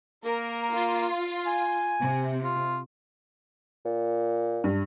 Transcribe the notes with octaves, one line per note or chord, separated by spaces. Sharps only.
A#3 A#4
F4
G#5
C3
F4
A#2
G2